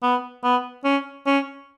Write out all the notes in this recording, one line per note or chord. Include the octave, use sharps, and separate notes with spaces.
B3
B3
C#4
C#4